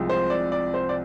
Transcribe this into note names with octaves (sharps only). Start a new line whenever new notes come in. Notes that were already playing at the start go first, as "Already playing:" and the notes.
Already playing: C2 C3 F3 G#3
C5
D5
D5
C5
D5